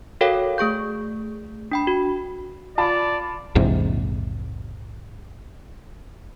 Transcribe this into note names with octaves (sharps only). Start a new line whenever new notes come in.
F#4 A4 A#4 C#5 F5 G5
A3 G#4 C#6 G6
D4 G5 B5
F#4
F4 D5 A5 B5
A#1 E2 G#2 C3